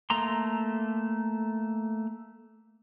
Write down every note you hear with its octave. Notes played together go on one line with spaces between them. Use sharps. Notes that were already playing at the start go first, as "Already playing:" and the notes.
A3 A#3 A#5 C6